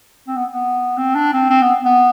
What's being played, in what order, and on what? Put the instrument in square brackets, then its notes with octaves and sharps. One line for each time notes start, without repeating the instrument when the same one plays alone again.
[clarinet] C4
B3
B3
C4
D4
C4
C4
B3
B3